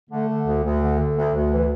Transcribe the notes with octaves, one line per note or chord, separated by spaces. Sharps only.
D3 A3
D3
D2
D2
D3
D3
D2
D2
E3